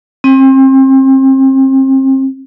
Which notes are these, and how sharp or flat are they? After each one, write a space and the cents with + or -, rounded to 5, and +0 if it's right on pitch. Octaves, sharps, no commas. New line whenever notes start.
C4 +35